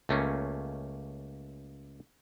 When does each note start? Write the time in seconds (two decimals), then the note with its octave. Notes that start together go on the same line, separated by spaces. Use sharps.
0.09 C#2 A3 A#3 C#4